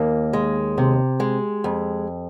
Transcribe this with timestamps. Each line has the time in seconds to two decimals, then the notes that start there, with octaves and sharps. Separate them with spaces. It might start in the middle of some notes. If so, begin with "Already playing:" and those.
Already playing: D#2 A#3
0.33 G#3
0.78 C3
1.20 G#3
1.64 F2